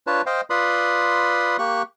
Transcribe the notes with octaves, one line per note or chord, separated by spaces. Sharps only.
D4 F4 B4 C#5 A5
C5 D#5 F5 G5
F4 B4 D5 B5 C6 D#6
A#3 G4 C#6 F#6